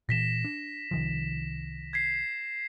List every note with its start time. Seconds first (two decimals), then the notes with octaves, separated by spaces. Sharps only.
0.09 A#2 E3 A#6 B6 E7
0.44 D4
0.91 C2 D#3 F3
1.93 G#6 B6 C7